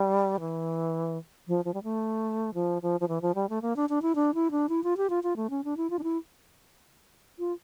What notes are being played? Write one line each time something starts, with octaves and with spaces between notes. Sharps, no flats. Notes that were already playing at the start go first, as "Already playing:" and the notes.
Already playing: G3
E3
F3
F3
G3
A3
F3
F3
F3
E3
F3
G3
A3
A#3
D4
D4
E4
D4
E4
D4
E4
F4
G4
F4
F4
A3
C#4
D4
E4
F4
D4
E4
F4